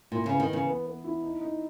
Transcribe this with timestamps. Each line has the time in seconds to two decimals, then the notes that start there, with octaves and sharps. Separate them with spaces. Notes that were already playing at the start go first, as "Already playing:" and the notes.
0.11 A#2 E4
0.26 C#3
0.31 B3
0.40 D#3
0.48 C#3 E3
0.67 B3
0.86 B3
1.04 E4
1.22 D#4
1.41 D#4